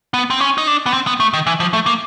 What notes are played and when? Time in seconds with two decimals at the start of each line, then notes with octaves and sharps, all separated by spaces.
0.14 B3
0.30 C4
0.40 C#4
0.58 D#4
0.67 D4
0.86 B3
0.93 C4
1.07 B3
1.20 A3
1.33 D#3
1.47 E3
1.60 F3
1.73 A3
1.86 A#3